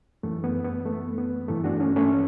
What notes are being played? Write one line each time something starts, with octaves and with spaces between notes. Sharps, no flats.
F#2 E3 A3
B3
B3
A3
B3
G2 E3 A3
D4 F#4
A3 C#4
A3 C#4